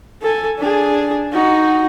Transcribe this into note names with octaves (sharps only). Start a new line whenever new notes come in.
A4 G#5
D4 G#4
D#4 F#4